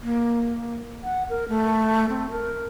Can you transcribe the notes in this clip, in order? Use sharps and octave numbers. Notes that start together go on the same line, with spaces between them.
A#3
F#5
A#4
A3
C4
A#4